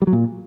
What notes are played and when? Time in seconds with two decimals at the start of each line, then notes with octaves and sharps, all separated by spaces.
0.02 G3
0.07 F#3
0.13 A#2